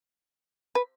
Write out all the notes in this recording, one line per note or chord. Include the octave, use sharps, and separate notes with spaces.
B4